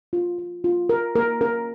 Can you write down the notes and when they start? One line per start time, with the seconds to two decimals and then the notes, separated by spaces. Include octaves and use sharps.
0.13 F4
0.39 F4
0.64 F4
0.89 F4 A#4
1.15 A#3 A#4
1.41 C#4 A#4